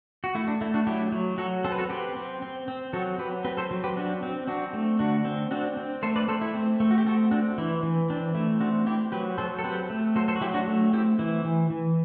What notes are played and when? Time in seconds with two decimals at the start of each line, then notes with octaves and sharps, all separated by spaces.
0.24 F#4
0.35 A3 E4
0.48 D4
0.61 A3 E4
0.74 D4 F#4
0.87 F#3 E4 G4
1.12 F#3
1.38 F#3 F#4 A4
1.64 C4 A4
1.72 B4
1.78 F#4 A4
1.90 C4 G4 B4
2.16 C4
2.42 C4
2.68 C4
2.93 F#3 F#4 A4
3.18 F#3 G4 B4
3.45 C4 G4 B4
3.57 A4 C5
3.71 F#3
3.84 G4 B4
3.96 C4 D4 F#4
4.23 C4
4.47 C4 D4 F#4
4.73 A3
4.99 D3 D4 F#4
5.25 C4
5.51 C4 D4 F#4
5.77 C4
6.03 A3 A4 C5
6.16 B4 D5
6.28 A3 A4 C5
6.41 E4
6.55 C4
6.80 A3
6.91 F#4
6.98 G4
7.06 C4 F#4 A4
7.31 C4 D4 F#4
7.58 E3 E4
7.83 E3
8.10 C4 D4
8.35 A3 E4
8.60 C4 D4 F#4
8.86 C4 E4 G4
9.12 F#3 G4 B4
9.38 F#3 A4 C5
9.59 A4
9.64 C4 G4 B4
9.90 A3
10.16 F#3 A4 C5
10.28 A4 C5
10.36 F#4
10.41 F#3 E4 G4
10.54 D4 F#4
10.68 A3
10.93 C4 E4 G4
11.19 E3 E4
11.45 E3
11.70 E3